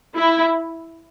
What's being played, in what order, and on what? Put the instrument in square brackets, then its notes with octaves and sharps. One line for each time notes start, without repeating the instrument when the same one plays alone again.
[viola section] E4